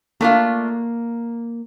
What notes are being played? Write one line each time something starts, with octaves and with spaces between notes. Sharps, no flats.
A3 A#3 D4 F4